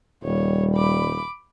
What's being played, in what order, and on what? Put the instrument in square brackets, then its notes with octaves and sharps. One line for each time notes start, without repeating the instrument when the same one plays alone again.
[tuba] D#1 [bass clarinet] G3 [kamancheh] C#5
[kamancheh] B5 D6